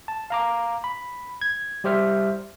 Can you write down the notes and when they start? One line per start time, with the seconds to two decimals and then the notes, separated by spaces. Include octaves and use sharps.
0.08 A5
0.30 F5 A#5 D6
0.84 B5
1.42 G#6
1.84 G3 G4 C5 E5 F6